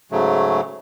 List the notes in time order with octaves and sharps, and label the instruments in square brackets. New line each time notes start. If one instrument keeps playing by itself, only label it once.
[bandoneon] G#2 C#3 F#3 A3